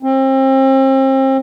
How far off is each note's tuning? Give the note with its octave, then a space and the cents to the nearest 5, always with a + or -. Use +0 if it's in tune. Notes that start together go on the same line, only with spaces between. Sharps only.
C4 +35